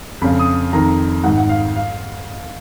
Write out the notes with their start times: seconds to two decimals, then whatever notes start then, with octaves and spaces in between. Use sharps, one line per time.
0.22 F2 C#3 B5
0.39 D#6
0.73 F2 D#3 A#5
1.24 G#2 D#3 F#5
1.37 F#5
1.49 F5
1.76 F5